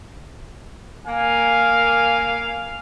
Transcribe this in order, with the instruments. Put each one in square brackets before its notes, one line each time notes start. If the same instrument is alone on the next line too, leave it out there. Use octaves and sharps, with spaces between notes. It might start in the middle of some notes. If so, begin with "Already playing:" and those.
[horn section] A#3 G#5 [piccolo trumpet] F5